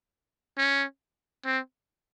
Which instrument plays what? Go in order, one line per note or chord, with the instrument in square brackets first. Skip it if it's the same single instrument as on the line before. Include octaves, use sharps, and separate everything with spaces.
[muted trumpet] C#4
C4